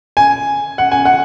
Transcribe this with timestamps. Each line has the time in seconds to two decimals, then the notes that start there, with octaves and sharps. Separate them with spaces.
0.17 G#5
0.78 F#5
0.92 G#5
1.05 F#5